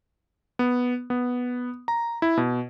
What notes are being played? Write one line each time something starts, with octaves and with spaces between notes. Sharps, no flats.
B3
B3
A#5
E4
B2